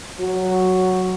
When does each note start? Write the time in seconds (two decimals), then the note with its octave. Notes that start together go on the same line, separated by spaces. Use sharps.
0.20 F#3